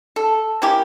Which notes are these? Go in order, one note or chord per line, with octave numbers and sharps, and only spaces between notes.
A4
A#3 C#4 E4 G4